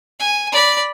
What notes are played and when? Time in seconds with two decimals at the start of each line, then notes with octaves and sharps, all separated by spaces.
0.20 G#5
0.52 D5 B5